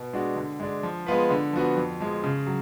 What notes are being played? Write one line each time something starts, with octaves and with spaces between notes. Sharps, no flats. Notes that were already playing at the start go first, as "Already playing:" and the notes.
Already playing: B2
G#3 D4 F#4
D3
G#3 D4
F3
G#3 B3 F4 B4
D3
F3 B3 F#4
F2
F3 G#3
C#3
F#3